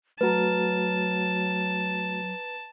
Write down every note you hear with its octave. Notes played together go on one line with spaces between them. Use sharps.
F#3 A3 F#4 B4 A5 A#5